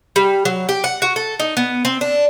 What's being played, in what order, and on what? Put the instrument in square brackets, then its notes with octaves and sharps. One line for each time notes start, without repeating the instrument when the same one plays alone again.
[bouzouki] G3
F#3
G4
F#5
F#4
A4
D#4
B3
C4
D4